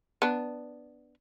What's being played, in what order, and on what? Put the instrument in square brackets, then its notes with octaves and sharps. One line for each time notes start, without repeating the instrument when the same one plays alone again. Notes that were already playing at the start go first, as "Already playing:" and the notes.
[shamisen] B3 D4